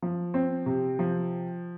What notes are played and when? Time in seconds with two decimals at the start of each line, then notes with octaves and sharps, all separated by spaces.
0.02 F3
0.34 C4
0.66 C3
0.99 F3